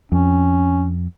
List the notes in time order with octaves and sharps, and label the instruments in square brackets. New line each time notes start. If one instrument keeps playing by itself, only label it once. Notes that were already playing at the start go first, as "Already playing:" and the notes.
[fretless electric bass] F2 [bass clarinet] C#4